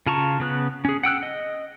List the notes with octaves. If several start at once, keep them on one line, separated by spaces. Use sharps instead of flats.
C#3 F4 A5 A#5 C#6
C#3 B3 F#6
C#4 G#4
F#5 G5 E6 F#6
D#5